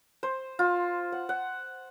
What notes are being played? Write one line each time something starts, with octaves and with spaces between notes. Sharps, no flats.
C5
F4
F#5
F#5